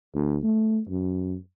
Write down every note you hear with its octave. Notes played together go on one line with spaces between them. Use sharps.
D2
A3
F#2